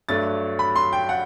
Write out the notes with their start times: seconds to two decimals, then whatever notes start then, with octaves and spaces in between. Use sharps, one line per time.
0.09 G2 F#3 A3 D4 A6
0.59 B5
0.76 C6
0.93 G5
1.09 F#5